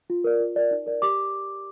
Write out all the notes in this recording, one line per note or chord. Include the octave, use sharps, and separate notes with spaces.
F4
A#4 D5
F4
A#4 D5
D#4
A#4 D5
G4 D6